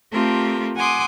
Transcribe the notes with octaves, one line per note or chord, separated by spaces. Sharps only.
A3 C4 F4 G4 A4 A#4
F#5 G#5 C6 D6 D#6